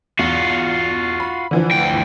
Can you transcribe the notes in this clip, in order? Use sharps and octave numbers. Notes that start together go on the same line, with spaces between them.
E2 F4 F#4
B5
D3 E3 F3
D2 G5